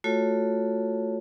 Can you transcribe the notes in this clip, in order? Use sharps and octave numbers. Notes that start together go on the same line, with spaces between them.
A3 F4 F#4 A4 C#5